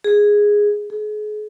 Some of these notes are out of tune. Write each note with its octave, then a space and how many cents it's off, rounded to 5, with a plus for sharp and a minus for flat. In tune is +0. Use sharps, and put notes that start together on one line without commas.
G#4 -5
G#4 +35